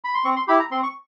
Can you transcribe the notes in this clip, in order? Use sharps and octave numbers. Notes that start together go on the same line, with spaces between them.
B5
C6
C4 C#6
C6
E4 G4 B5
A#5
C4 C6
C#6